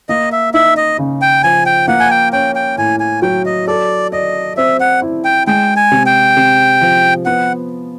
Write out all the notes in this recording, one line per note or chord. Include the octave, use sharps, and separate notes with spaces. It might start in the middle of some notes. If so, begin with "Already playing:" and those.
A#3 D#5
E5
D#4 E5
D#5
C#3
G5
F3 G#5
G5
A#3 F#5
G#5
G5
C#4 G5
G5
A2 G#5
G#5
F#3 G5
D#5
A4 D5
D5 D#5
C4 E5
F#5
E4
G5
G#3 G5
G#5
C3
G5
C3
F3
B3 F#5